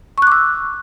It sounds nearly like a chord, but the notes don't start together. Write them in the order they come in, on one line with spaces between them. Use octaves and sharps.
C#6 F#6 D6 E6